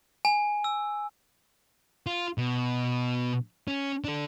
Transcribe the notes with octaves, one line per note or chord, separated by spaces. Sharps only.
G#5
E6
F4
B2
C#4
D4 A4